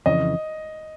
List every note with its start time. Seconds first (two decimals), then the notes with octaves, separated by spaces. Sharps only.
0.06 F2 C#3 E3 D#5